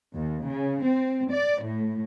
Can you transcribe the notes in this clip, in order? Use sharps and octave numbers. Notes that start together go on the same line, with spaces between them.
D#2
C#3
C4
D5
A2